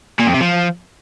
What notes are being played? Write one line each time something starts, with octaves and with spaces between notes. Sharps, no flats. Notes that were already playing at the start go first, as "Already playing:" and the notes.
A#2
F2
C3
F3